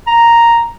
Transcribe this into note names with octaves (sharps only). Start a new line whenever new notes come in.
A#5